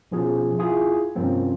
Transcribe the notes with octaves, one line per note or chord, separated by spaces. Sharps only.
B2 F3 C#4 G#4
E4 F4 G#4
G2 C3 F3 A#3 C4 C#4